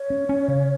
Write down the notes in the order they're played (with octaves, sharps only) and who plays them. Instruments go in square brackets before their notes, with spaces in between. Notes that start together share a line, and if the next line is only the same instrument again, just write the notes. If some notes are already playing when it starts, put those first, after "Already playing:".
Already playing: [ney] C#5
[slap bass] C#4
C#4
C#3